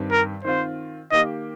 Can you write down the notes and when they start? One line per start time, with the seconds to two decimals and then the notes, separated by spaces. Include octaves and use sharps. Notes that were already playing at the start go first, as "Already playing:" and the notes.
Already playing: G2 D#3 C4 G4
0.11 A#4
0.44 D#3 C4 F4 C5
1.11 D#3 A#3 G4 D#5